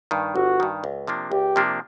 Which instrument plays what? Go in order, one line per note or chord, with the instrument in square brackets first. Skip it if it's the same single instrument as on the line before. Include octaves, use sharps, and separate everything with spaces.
[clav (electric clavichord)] G2 D#3
[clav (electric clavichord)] G1 [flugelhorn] F#4
[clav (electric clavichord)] G2 D#3
C#2
C3 F3 A#3 D4
[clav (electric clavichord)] C#2 [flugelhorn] G4
[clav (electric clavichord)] C3 F3 A#3 D4